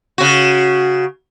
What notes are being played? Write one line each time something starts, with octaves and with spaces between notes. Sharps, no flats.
C#3 F#4